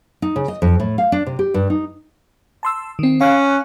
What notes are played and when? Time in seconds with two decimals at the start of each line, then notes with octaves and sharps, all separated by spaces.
0.22 D#4
0.36 C#3
0.48 D#5
0.62 F2
0.80 A2
0.98 F5
1.12 D4
1.27 C3
1.39 G4
1.54 G2
1.70 D#4
2.63 A5 C6 E6
2.99 D#3 C4
3.21 C#4 F5 F#6